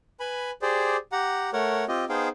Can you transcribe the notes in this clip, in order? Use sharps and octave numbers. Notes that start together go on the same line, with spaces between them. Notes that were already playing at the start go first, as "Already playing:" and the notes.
B4 G#5 B5
G4 G#4 C5 D5
G4 F#5 A#5
A3 A#4 C#5 F#5
C4 F4 G4 D#5
B3 D#4 G#4 C5 F5 G5